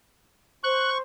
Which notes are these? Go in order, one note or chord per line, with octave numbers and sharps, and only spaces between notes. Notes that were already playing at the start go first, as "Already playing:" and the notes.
C5 C#6 F#6